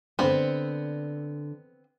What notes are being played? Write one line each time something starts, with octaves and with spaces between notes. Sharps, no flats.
D3 B3 C4 D5